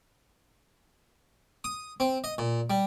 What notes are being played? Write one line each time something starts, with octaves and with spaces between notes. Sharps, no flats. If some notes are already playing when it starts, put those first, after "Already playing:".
D#6
C4
D#5
A#2
G3